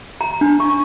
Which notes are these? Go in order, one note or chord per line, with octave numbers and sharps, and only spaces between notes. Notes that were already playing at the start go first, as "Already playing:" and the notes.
A#5
D4
C#6